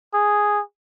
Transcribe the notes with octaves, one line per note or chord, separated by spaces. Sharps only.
G#4